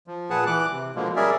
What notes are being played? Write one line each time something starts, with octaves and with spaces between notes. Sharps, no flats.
F3
A#2 G#4 B4 F#5 A5
E3 D6 F#6
C3
B2 D3 F3 G#3 A#3
G3 C#4 G#4 A#4 D5 E5